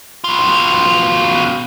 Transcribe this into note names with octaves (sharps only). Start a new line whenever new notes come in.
B2 F4